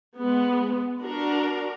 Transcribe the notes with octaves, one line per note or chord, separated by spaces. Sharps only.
G#3 B3
D4 F#4 A#4